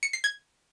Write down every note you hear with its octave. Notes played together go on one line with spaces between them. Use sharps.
C#7
C7
G#6